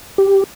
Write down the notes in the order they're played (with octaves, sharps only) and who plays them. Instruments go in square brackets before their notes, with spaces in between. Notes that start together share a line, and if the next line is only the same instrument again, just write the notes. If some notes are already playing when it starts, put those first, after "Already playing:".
[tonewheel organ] G4